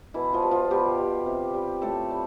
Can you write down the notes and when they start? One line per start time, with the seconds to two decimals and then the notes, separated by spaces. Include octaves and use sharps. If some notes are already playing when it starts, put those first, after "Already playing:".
0.14 B2 E3 E4
0.33 F3 F4
0.42 G3
0.51 F3 F4
0.70 B2 G3 G4
0.98 G3
1.26 C3
1.54 G3
1.82 A2 A3 A4
2.11 G3